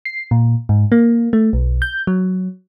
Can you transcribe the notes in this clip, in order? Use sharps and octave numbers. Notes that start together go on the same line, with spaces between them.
C7
A#2
G#2
A#3
A3
B1
G6
F#3